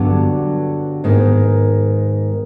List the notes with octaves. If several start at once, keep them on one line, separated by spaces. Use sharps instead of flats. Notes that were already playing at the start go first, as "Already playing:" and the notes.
Already playing: G2 D3 F#3 B3
G#2 D#3 G#3 B3